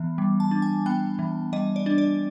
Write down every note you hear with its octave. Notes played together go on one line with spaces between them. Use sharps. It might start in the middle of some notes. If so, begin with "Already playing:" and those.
Already playing: E3 B3
G3
A5
D4
G#5
B3 G5
E3
G3 D#5
D5
D4
D5